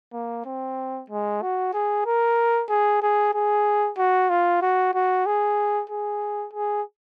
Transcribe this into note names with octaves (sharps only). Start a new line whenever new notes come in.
A#3
C4
G#3
F#4
G#4
A#4
G#4
G#4
G#4
F#4
F4
F#4
F#4
G#4
G#4
G#4